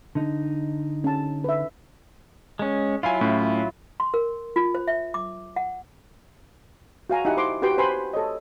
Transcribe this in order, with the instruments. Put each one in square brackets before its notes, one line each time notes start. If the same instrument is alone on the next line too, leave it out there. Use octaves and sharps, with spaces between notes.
[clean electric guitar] D3 D#4
[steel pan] C#4 A5
B4 E5
[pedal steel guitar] G#3 C#4
[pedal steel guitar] F#3 E4 F4 [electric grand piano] F5 G#5
[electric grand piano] A2 C#4
[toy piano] C6
A#4
F4
C5
E5
D6
F#5
[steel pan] F#4 F5 G#5 A#5
D#4 E4 G4 F#5 G#5
C5 C6 D6
F#4 G4 B4 G5 C6
B4 C5 G#5 B5 C6
A4 C#5 D#5